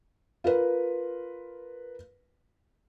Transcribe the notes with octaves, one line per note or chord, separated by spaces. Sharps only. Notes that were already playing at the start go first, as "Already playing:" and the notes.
F4 A#4 B4